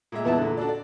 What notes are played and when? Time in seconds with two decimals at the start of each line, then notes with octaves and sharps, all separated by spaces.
0.12 A#2 G#3 E5
0.25 E2 B3 E4 E5 A5
0.38 A#2 D3
0.57 D4 F#4 A4 D5
0.69 D5